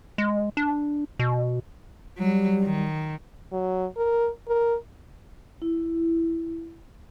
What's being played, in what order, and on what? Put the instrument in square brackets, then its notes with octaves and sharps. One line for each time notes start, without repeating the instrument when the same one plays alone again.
[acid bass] G#3
D4
B2
[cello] F#3 [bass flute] G3
[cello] D#3
[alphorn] F#3
A#4
A#4
[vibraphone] E4